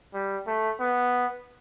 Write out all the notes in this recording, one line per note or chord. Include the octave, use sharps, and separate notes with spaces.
G3
A3
B3